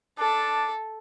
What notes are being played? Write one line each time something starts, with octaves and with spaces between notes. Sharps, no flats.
D4 A4